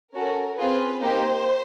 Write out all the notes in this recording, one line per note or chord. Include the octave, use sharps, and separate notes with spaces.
C#4 F#4 A4 A#4
C4 F4 G#4 B4
A#3 D#4 G4 C5